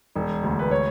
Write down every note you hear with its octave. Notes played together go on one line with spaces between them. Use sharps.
E1
D2
B4
C#5